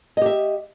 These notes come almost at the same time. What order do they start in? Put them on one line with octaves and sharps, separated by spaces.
D#5 G4 E5